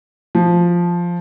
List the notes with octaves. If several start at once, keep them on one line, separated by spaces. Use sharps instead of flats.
F3